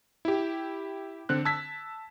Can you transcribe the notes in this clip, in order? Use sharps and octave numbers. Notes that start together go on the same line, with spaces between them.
E4 G4
D3 C4 F#6
A5 E6 G#6 B6